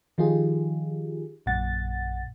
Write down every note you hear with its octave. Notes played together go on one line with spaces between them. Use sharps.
D#3 F3 D#4 F4 G4 G#4
A#1 F#2 A#2 F#5 A6